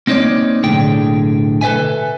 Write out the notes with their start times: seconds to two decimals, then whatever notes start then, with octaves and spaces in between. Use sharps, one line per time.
0.07 A#3 C4 D#4 A4 C#5 D5
0.63 B1 A2 D3 G#4 G5
1.61 A4 B4 D5 E5 G#5